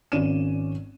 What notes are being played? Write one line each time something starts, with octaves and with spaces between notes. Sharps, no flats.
G#1 C#4 D5 D#7 E7